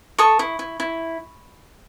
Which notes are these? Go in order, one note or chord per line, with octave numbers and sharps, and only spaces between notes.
A4 C#6 D#6
E4
E4
E4